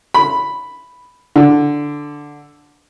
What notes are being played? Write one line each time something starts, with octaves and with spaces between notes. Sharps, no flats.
B5
D3